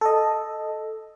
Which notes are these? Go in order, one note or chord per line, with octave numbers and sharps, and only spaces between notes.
A4 D#5